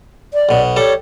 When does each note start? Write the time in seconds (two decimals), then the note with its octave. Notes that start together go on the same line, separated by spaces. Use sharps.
0.34 D5
0.49 B1 B2
0.76 G3 A4 C#5